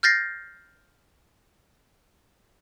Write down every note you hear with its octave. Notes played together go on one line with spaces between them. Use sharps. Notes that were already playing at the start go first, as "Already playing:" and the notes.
F6 G6 A6 A#6 C7